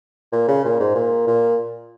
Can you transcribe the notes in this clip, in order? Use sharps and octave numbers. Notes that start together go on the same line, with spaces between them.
A#2
C#3
A#2
G#2
A#2
A#2